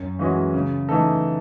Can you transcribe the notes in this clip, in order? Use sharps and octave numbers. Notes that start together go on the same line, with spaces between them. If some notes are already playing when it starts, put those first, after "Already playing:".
Already playing: F#2
E3 G#3 C#4 F#4
C#3
E3 A3 D#4 A4